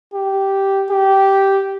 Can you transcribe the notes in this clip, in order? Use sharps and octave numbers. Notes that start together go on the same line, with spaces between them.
G4
G4